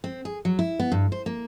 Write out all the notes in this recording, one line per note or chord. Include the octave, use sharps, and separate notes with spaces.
C4
G#4
F#3
E4
B3
G2
C5
A#3